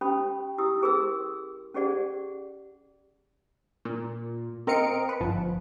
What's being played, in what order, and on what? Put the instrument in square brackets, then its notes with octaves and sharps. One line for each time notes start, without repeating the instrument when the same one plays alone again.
[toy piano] C#4 G4 A4 G5 B5 C6
E4 G4 D#6 E6
C#4 G4 G#4 A#4 C6 E6
C#4 G4 G#4 D5 F#5
[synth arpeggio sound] A#2
C4 A#4 D#5 F5 C#7 D7
B4
G1 F3